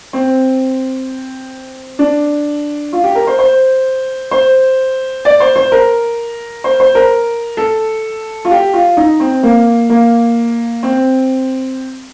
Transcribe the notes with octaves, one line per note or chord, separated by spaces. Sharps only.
C4
D4
F4
G4
A#4
C5
C5
C5
D5
C5
C5
A#4
C5
C5
A#4
A4
F4
G4
F4
D#4
C4
A#3
A#3
C4